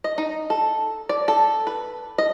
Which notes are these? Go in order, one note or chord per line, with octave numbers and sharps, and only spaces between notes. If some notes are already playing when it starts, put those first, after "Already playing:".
D#5
D#4
A4
D5
A4
B4
D#5